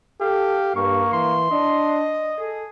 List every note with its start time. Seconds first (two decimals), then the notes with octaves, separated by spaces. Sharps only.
0.21 G4 A4 F5
0.76 G2 A#3 C#6
1.13 E3 C6
1.52 D4 D#5
2.39 G#4 A4